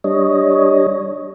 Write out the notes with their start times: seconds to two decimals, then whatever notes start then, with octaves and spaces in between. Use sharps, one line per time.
0.04 G3 D4 C#5 D#5